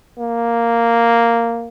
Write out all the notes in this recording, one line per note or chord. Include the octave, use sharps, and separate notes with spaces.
A#3